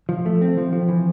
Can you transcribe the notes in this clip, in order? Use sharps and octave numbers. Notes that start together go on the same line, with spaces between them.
F3
A3
C4
F3
F3
E3